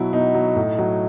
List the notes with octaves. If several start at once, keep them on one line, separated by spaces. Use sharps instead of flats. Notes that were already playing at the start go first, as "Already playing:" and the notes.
Already playing: B2 F#3 E4
B2 D#4
F#3
A2
F#3